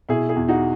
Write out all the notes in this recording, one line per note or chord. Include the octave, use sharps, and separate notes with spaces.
B2 E4 G#4
E4 G#4
E2
D#4 F#4